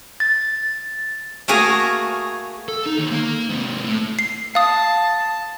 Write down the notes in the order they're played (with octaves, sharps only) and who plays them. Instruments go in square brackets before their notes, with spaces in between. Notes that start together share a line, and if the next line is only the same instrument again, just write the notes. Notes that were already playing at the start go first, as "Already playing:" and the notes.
[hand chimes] A6
[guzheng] A3 A#3 F#4 G#4 F5 G#5
[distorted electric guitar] A4
D#4
D#2
A#3 A#5
G#2 C3
A2
[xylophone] C7
[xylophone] F5 D#6 [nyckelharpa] A5